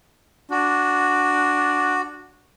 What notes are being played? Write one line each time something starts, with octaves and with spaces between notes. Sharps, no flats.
D4 F#4